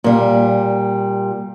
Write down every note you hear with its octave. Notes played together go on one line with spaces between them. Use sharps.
A#2 G3